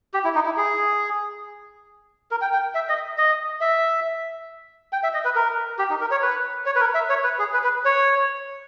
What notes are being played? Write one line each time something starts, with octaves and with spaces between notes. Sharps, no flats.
G4
E4
D#4
E4
G#4
A#4
G5
G5
E5
D#5
D#5
E5
G5
E5
D#5
B4
A#4
G4
D#4
A#4
C#5
B4
C#5
B4
A#4
E5
C#5
B4
G#4
B4
B4
C#5